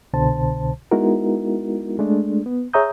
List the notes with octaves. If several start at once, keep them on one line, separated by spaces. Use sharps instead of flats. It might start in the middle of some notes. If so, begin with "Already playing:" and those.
C2 B2 D3 C5 A5
G#3 B3 D#4 E4 F#4 A#4
G#3 A3 D4
B3
G#4 C#5 E5 A#5 D#6 G6